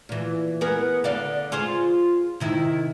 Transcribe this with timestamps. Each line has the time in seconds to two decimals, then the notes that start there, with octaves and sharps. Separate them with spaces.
0.09 A#2 E3
0.61 B3 G#4 A#4
1.04 D3 D5 F5
1.52 F4 G#4 C5
2.40 C3 D#3 E4